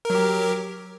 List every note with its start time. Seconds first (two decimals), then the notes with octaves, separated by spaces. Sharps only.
0.05 A#4
0.10 F#3
0.15 G4